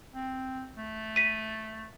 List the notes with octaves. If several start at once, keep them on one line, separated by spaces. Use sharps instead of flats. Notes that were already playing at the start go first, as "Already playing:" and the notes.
C4
A3
B6 D#7